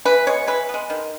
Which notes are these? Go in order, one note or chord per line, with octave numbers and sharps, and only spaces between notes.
E3 B4
G#3 B3 C#5
E3 B4
G#3 B3
D#3